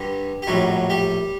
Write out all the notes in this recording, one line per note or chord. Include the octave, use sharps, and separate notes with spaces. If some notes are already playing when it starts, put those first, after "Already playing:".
Already playing: G2 D3 G3 G4
G4
A#1 A2 F#3 G3 F#4
G3 G4